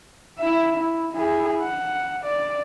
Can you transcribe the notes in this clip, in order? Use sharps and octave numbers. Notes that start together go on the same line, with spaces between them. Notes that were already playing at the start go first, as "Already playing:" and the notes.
E4 E5
E4
E4 G#4
F#5
D5